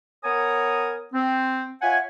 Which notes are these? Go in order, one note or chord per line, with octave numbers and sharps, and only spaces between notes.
B3 A#4 C#5 G#5 A#5 D#6
C4
F4 C#5 E5 F#5 G#5